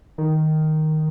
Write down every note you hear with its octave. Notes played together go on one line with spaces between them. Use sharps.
D#3